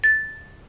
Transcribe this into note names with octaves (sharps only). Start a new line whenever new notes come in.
A6